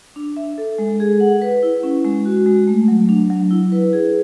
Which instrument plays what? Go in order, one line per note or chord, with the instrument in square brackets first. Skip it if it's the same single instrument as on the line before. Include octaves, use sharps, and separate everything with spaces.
[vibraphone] D4
E5
A4
G#3
G#4
F#5
B4
E4
C#4
G#3
F#4
G#3
A3
F#3
D4
F#3
E4
B4
G#4